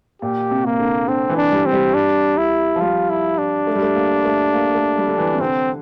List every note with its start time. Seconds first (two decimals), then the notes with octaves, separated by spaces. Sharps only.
0.22 A#2 G4
0.51 C3
0.65 A#3
0.79 D3
1.08 D3 C4
1.29 E3
1.37 D4
1.52 G3
1.66 C4
1.73 G3
1.94 D4
2.38 E4
2.76 F3
2.81 G3 F4
3.10 E4
3.38 D4
3.67 A3
3.75 G3
3.82 A3
3.96 A#3
4.25 A3
4.54 A#3
4.75 A3
4.97 G3
5.08 D3
5.18 E3
5.34 C3
5.40 D3 C4